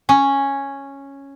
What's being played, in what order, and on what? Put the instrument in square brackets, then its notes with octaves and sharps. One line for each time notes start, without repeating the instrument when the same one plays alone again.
[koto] C#4